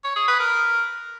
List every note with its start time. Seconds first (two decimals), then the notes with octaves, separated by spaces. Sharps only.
0.04 C#5
0.16 G#4
0.28 B4
0.40 A#4